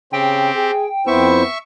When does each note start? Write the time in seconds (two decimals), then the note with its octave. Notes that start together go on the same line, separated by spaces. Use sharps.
0.13 C#3 C4 G4 G5
0.55 G#4
1.07 F2 B3 E4 C5 E5 C#6